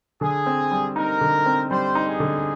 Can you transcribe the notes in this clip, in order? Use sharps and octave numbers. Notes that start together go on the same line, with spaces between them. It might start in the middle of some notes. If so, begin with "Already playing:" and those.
D3 G#4
C4
G3
D#4 A#4
D3
C4
G3 C5
D#4
G#4
D3